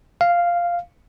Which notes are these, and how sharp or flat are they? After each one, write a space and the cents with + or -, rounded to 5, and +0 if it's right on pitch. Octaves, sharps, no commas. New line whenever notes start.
F5 -5